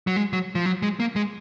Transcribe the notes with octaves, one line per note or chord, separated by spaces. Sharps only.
F#3
G#3
F#3
F3
F#3
G#3
A#3
G#3